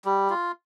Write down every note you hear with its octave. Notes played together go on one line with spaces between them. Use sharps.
G3
F4